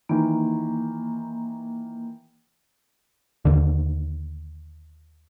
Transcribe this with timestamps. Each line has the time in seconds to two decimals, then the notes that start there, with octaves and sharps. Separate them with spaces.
0.09 D#3 E3 A#3
3.45 D#2 D3